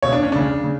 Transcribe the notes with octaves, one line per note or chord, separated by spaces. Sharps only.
C#2 B2 C#5
D4
C#4
C#2 C#3 D4
C#3